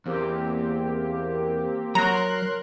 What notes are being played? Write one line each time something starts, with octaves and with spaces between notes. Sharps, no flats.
E2 A#3 C4 G4
F#3 A#4 A#5 C6 F#6